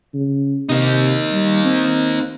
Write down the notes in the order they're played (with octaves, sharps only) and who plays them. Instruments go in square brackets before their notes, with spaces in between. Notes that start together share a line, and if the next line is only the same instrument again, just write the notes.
[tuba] C#3
[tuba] C3 [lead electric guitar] A#3 D#4
[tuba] G3
C4